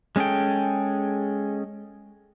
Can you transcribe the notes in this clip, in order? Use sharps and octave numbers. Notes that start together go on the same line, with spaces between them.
G#3 C#4 G#4 A4 G5